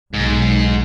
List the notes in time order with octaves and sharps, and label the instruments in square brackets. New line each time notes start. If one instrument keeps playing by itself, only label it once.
[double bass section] B1 [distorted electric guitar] G#2